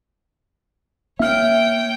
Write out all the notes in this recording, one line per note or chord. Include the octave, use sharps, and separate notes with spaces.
A#3 C#5 E5 G5 F6